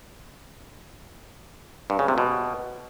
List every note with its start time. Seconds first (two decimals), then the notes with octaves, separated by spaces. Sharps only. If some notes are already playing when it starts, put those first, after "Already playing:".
1.90 G2
1.99 C#3
2.08 C3
2.18 B2